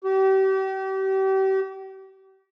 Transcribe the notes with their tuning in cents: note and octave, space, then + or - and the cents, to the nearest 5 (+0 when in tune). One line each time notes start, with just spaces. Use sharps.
G4 -35